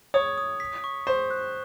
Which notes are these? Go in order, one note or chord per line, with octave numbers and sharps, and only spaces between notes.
C#5 D#6
D#6
B6
C#6
C5 C#6
F#6